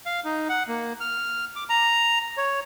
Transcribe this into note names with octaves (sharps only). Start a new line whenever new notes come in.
F5
D#4
F#5
A#3
F6
D6
A#5
C#5